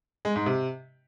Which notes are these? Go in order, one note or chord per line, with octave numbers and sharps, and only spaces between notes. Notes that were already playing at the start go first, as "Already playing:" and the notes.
G#3
G#2
C3